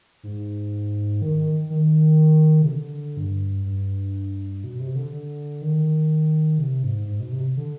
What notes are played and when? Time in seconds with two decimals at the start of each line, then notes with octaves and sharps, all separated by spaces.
0.23 G#2
1.22 D#3
1.38 D#3
1.70 D#3
2.62 C3
2.67 D3
3.17 G2
3.65 G2
4.64 B2
4.80 C3
4.96 D3
5.13 D3
5.61 D#3
6.58 C3
6.83 G#2
7.07 G#2
7.20 B2
7.32 C3
7.57 D3